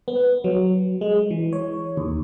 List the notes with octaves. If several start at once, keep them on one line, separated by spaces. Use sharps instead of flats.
B3
F#3
G#3
E3
C#5
D#2